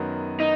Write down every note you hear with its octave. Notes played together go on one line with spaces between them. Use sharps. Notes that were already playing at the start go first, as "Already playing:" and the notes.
Already playing: F#2 D#3 F#3 B3
D#4